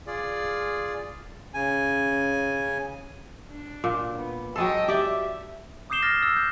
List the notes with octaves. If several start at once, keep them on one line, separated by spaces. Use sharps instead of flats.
F4 G#4 D5
C#3 C#4 G#5
D4
A#2
B3
F#3 G#3 A4 D#5 G5
G4 D5 E5
D6 D#6 G6 C7 E7 G7
F6 A6 A#6
E6
G6